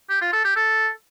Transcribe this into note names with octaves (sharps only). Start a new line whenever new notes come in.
G4
F4
A4
G4
A4